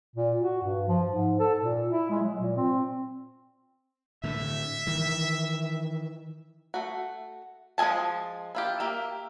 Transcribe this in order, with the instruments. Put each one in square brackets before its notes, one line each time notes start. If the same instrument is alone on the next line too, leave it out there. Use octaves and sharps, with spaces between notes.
[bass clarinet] A#2
F#4
G2
F3
G#2
A4
A#2
E4
G#3
F#3
A#2
C4
[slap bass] A2 D3 [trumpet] E5
[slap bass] D#3 E3
[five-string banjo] A3 F#4
F3 G#3 D#5 G#5 A5
E4 F4 G4
A#3 G4 E5